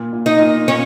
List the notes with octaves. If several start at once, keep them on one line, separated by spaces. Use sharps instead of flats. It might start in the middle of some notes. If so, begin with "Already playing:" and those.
Already playing: A#2
A#2
D#4
A#2
A#3 C#4